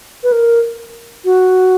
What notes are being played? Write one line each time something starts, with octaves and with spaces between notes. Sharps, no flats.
B4
A#4
F#4